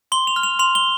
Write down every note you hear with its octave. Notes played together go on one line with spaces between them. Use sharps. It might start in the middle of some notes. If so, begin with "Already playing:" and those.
C6 G7
F7
F6
F7
C6 F7
G7